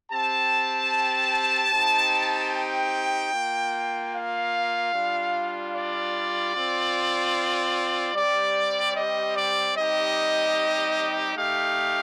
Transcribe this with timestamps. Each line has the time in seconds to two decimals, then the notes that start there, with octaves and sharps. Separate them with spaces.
0.11 C4 G4 A5
1.72 C4 D#4 G4
2.53 G5
3.33 A#3 F4
4.14 F5
4.94 G3 D4 F4
5.73 D5
6.54 C4 F4
8.14 G3 C4 G4 D5
8.95 D#5
9.35 D5
9.75 G3 C4 D#4 G4 D#5
11.35 A3 D#4 G4 F5